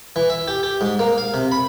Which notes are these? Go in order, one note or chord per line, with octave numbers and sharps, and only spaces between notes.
E3
E5
G4
G4
G#2
A#3
F5
C3
B5